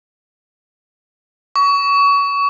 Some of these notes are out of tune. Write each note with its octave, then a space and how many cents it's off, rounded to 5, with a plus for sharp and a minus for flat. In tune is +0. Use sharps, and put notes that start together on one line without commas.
C#6 +30